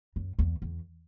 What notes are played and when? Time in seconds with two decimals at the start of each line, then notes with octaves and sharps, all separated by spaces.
0.16 F#2
0.39 E2
0.62 E2